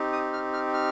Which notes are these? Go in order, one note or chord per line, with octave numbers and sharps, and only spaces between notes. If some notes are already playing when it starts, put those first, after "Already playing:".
Already playing: C4 D#4 G4
D#6
F6
F6
F6